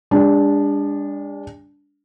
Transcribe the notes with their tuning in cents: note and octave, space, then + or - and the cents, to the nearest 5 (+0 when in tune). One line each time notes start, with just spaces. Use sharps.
G#3 -45 D4 -15